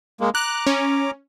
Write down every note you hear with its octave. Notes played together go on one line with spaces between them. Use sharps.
G#3 A#3
A#5 D6 F#6
C#4